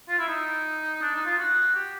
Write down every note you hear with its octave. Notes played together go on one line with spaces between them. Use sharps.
F4
E4
D#4
D4
D#4
F4
F#4
G4